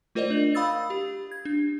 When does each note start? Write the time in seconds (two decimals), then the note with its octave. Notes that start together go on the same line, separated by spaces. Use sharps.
0.15 A3 F4 A#4 C5 D5 D#5
0.30 D4 F#7
0.55 F5 B5 D#6 E6 A6
0.90 G4
1.31 G#6
1.45 D4